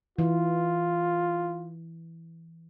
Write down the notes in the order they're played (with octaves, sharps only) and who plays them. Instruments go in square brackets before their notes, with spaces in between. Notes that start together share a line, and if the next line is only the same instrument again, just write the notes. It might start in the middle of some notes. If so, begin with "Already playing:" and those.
[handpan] E3 [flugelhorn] F4